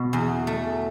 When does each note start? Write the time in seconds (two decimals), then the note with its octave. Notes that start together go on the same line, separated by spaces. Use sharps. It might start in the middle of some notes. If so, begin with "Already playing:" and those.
Already playing: B2
0.13 E2
0.47 A3